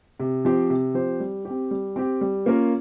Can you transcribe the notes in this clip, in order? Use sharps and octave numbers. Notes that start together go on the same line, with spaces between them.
C3
F3 C4 G4 C5
C3
F3 C4 G4 C5
G3
C4 G4
G3
C4 G4
G3
A#3 C#4 F4 A#4